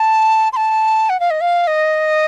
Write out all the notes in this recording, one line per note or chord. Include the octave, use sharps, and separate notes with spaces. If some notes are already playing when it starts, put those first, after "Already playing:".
Already playing: A5
C6
A5
F#5
F5
D#5
F5
D#5